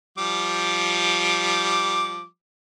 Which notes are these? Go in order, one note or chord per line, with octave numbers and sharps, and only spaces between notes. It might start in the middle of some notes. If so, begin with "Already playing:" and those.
F3 G3 D6